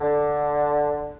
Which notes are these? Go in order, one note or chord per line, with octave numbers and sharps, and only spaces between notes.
D3